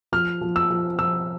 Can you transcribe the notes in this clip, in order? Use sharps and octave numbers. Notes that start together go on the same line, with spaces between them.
F3 F6
F3
E6
F3
F3 E6